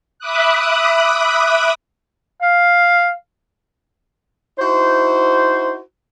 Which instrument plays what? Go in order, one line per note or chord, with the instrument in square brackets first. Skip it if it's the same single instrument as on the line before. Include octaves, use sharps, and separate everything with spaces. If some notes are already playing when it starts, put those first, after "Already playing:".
[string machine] E5 B5 D6 D#6 F#6
[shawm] F5
[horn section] D#4 E4 F#4 C5